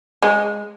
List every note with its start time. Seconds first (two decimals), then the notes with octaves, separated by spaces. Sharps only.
0.22 G#3